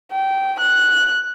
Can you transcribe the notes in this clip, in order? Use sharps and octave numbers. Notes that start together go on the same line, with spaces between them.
G5
F#6